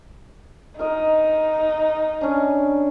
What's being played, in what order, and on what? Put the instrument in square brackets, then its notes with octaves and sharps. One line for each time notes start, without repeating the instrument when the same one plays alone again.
[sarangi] D#4 [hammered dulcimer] A#4 D#5
[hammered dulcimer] C#4 D4